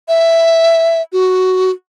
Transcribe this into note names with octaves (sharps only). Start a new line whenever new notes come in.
E5
F#4